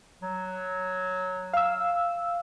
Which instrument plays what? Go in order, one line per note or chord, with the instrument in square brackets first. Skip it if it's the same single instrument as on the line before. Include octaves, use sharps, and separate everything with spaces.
[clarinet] F#3
[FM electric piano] F5 E6